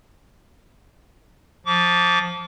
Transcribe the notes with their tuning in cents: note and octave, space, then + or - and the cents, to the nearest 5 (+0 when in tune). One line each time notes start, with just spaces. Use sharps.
F3 +10 D6 -35